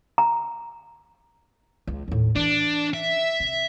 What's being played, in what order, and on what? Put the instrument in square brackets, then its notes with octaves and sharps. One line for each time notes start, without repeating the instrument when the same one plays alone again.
[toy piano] A#5
[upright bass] C#2
D#2 A2
[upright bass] E3 [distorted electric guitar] D4
[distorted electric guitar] E5
[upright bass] C3